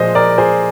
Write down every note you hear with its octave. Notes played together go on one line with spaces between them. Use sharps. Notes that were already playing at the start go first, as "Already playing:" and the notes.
Already playing: A#2 F3 G#3 C5 D#5
A#4 D5
G#4 C5